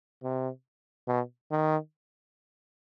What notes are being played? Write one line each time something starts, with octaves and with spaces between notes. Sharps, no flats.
C3
B2
D#3